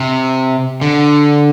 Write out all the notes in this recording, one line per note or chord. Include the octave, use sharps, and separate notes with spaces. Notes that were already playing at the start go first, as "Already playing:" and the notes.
Already playing: C3
D3